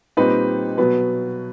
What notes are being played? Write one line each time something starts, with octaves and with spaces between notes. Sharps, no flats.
A#2 G3 C4 D#4 B4
B2 F#3 B3 B4